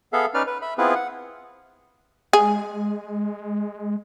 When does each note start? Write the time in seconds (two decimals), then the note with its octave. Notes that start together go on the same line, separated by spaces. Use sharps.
0.13 B3 G#4 A4 E5 F5
0.34 C#4 D#4 B4 D5 F6
0.47 B4
0.62 E5 B5
0.78 B3 C4 E4 F4 G#4 B4
0.95 F#5
2.33 G#3 G#4